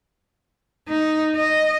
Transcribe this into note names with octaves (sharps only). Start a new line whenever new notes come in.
D#4
D#5